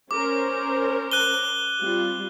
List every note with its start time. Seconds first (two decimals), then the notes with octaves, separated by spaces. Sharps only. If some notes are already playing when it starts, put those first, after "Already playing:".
0.11 C#4 A#4 C5 D6
1.11 F#6 D#7 G7
1.81 G3 C4 F4